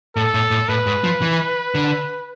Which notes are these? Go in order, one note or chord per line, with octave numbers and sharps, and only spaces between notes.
A2 A4
A2
A2
A2 B4
G#2
F3
E3
D3